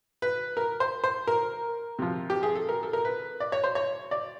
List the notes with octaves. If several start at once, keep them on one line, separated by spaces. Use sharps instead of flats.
B4
A#4
C5
C5
A#4
C3 F3
G4
G#4
A4
A#4
A4
A#4
B4
D5
C#5
C5
C#5
D5